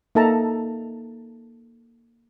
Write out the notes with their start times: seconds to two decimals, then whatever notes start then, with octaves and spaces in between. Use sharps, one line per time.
0.15 A#3 D#4 A4 E5 A5 A#5